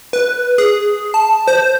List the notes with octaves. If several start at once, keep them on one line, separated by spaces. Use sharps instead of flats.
B4
G#4
A5
C5